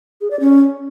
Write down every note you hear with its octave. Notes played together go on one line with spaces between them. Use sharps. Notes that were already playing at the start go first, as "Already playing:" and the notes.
G#4
D5
C#4